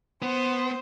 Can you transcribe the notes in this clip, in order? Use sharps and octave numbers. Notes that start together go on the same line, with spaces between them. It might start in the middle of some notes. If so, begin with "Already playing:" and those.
B3 C5